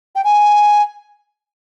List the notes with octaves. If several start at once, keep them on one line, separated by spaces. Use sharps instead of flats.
G5
G#5